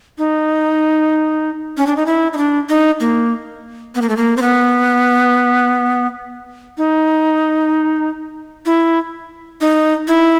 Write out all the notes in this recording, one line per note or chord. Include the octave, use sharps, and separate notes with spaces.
D#4
C#4
D4
D#4
E4
D#4
D4
D#4
A#3
B3
A#3
A3
A#3
C4
B3
D#4
E4
D#4
E4